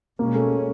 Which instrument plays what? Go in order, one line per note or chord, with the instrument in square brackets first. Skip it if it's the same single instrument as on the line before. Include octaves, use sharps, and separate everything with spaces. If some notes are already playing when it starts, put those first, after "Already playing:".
[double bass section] B2 G#3 C#4 [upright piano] A#3
[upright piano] A3
A3